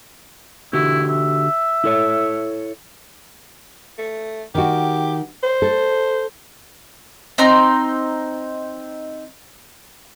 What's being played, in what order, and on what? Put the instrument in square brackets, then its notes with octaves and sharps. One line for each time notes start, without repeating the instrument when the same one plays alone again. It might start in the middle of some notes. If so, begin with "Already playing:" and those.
[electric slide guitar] D3 F#4 G4 [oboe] E4
[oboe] E5
[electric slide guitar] E4 A4 C#5
[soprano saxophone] A3
[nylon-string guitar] D#3 F#4 [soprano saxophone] G4
[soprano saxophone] C5
[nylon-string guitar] A4
[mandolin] C4 D#4 A#5